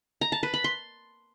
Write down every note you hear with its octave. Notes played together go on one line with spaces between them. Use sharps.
A#5
A5
B4
B5
C6